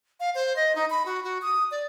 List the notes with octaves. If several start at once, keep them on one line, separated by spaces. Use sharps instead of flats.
F5
C5
D#5
D#4
B5
F#4
F#4
D#6
D5